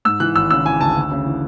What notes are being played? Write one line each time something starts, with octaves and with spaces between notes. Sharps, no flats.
G#2 E6
E3 F#6
G#1 E6
C#3 E6
E3 G#5
D2 A5
D2
C#3
E3